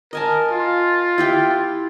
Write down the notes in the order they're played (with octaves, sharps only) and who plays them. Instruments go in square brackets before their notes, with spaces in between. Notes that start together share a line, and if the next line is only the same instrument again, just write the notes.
[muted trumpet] A#4 [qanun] D#5 G#5 A5
[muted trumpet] F4
[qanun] E4 G4 G5